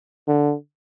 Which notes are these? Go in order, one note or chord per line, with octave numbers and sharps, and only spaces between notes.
D3